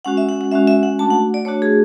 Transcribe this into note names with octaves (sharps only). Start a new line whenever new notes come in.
G#3 C#4 F#4 F#5
E5
F#5
F#5
G#3 C#4 F#4 E5
E5
F#5
A3 D4 F#4 A5
F#5
D5
A3 D4 F#4 C#5
G#4